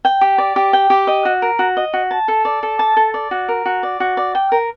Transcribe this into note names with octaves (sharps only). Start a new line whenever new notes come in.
G5
G4
D5
G4
G5
G4
D#5
F#4
A#4
F#4
D#5
F#4
A5
A4
D5
A4
A5
A4
D5
F#4
A#4
F#4
D5
F#4
D5
G5
A#4